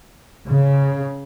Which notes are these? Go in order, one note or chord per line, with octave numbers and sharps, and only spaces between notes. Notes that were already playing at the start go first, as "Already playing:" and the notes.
C#3